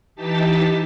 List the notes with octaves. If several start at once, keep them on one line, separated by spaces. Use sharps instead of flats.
E3 D#4 G4 A5 A6 B6